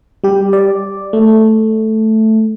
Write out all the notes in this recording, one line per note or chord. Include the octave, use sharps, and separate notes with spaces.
G3 G4
D5
A3